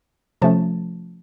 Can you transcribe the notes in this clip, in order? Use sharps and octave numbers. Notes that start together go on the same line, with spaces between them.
C3 F3 A3 C#4 A5